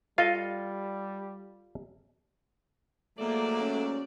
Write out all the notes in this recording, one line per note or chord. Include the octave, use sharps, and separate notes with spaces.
G3 F4 A4 D#5 F5
G#2 F#3 A3 A#3 D5
C#4